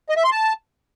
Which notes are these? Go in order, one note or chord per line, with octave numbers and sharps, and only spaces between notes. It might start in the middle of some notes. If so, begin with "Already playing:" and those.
D#5
E5
C6
A5